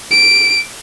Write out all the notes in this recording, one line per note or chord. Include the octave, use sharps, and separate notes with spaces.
D7